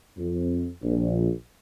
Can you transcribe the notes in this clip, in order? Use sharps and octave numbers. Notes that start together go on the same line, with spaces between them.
F2
A#1